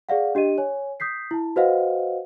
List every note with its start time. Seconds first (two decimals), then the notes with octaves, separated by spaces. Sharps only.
0.09 G#4 D5 F5 F#5
0.35 D4 G4 D#5 D#7
0.58 C#5 G#5
1.00 D#6 G6 B6 C7
1.31 E4 A5
1.56 F#4 B4 C5 D#5 F5 F#5